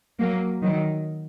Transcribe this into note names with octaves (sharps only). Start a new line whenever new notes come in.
F#3 A#3
D#3 F#3